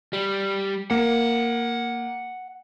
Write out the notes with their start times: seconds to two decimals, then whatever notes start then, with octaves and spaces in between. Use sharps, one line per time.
0.13 G3
0.91 A#3 F#5